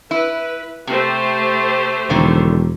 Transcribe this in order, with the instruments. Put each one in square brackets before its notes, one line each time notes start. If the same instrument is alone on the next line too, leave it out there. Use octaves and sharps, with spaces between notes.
[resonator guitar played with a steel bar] E4 [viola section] B4
[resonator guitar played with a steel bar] C3 [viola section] A3 G4 C5
[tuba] E1 [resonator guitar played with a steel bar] A2 D3 D#3